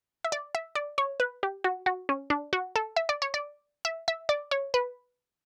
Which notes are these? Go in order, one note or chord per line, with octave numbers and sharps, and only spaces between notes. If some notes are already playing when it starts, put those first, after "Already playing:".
E5
D5
E5
D5
C#5
B4
G4
F#4
F#4
C#4
D4
F#4
A4
E5
D5
C#5
D5
E5
E5
D5
C#5
B4